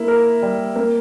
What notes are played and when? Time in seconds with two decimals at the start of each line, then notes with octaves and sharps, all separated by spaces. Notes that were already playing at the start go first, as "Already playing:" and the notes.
Already playing: A#3 E4
0.08 A#4
0.42 G3
0.76 A#3